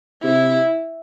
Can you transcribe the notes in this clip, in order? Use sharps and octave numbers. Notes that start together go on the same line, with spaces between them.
C3 E4